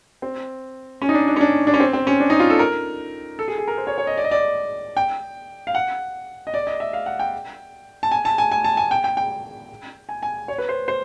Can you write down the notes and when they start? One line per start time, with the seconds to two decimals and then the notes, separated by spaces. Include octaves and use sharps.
0.22 C4
1.02 C#4
1.09 D#4
1.14 D4
1.28 D4
1.36 C#4
1.41 D4
1.67 D4
1.74 C#4
1.80 C4
1.93 C4
2.07 C#4
2.20 D4
2.30 D#4
2.40 F4
2.50 A4
2.59 A#4
3.39 A4
3.48 G#4
3.58 G#4
3.68 A#4
3.78 C5
3.87 C#5
3.98 C#5
4.07 D#5
4.17 D5
4.24 D#5
4.31 D5
4.97 G5
5.67 F5
5.75 F#5
6.47 D#5
6.54 D5
6.67 D#5
6.80 E5
6.93 F5
7.06 F#5
7.19 G5
8.03 A5
8.11 G#5
8.25 A5
8.38 G#5
8.51 G#5
8.64 A5
8.77 G#5
8.91 G5
9.04 G5
9.17 G5
10.09 G#5
10.23 G#5
10.48 C#5
10.58 B4
10.69 C5
10.88 C5